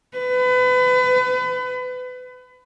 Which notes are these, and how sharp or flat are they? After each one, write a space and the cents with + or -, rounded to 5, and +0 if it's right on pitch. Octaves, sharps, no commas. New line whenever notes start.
B4 +30